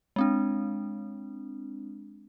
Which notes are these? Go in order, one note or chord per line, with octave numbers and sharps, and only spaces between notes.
G#3 C4 D4